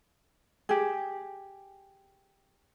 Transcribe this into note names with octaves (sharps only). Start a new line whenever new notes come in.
G4 G#4